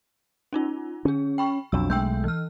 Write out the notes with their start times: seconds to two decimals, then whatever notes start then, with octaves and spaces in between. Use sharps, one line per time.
0.53 C#4 D#4 F4
1.05 D3 C#4 G#4
1.38 G5 B5 C#6
1.72 B1 F2 F#3 D4 E6
1.90 B1 G#3 A3 G5 E6 G6
2.24 E3 F6